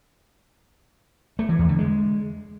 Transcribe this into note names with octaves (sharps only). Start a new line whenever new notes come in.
A3
E3
E2
D3
G#3